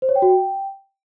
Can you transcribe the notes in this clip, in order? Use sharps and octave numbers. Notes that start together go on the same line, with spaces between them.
C5
C#5
G5
F#4
G5